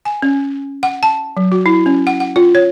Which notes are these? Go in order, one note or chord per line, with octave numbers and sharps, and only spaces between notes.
G#5
C#4
F#5
A5
F#3
F#4
E4
C#4
F#5
F#5
F4
C#5